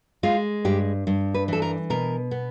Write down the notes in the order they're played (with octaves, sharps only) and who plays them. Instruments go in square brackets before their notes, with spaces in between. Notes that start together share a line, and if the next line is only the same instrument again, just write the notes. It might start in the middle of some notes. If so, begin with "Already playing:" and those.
[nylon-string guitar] G#3 F4
G2 G4
G2
B4
E3 A4
A#4
B2 A#4
B3